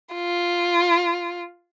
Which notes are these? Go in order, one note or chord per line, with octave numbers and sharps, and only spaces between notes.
F4